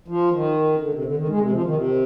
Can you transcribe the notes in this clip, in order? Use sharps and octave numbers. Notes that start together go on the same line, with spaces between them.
F3
D#3
D3
C3
D3
D#3
G#3
C3
F3
D#3
C3